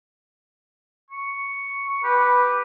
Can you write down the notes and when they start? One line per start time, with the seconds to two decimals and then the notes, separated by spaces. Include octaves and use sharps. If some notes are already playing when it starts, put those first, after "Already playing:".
1.10 C#6
2.04 G4 B4